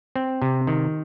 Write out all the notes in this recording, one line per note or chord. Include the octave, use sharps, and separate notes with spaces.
C4
C3
D#3